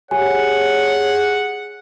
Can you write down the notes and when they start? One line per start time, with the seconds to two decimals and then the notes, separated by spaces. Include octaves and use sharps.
0.11 G4 G#4 C#5 F#5 G#5